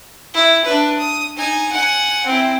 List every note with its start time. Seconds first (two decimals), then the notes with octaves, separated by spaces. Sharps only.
0.34 E4
0.65 D4 B4
0.98 D#6
1.37 D#4 G#5
1.72 F#5 G#5
2.26 C4 E4